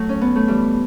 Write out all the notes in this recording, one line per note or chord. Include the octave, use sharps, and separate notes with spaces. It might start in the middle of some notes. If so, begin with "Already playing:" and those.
Already playing: F#3 A3
C#4
B3
A3
E3 G3